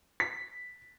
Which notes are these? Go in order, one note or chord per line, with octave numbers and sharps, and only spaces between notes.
B6